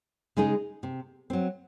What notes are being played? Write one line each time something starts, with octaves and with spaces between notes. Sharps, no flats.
C#3 G#3 D#4 G#4
C3
F#3 C4